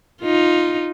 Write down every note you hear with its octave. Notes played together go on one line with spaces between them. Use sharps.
D#4 F4